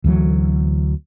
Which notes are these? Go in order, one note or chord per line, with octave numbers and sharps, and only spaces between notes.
D2 E3 F#3